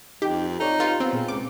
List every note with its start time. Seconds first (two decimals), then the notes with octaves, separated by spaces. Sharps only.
0.22 F2 D#4 G4 G5
0.60 D#4 A4 C#5 D5
0.80 F4 G4 B4
1.00 B3 C4
1.13 A#2 G#4
1.28 C#2 D6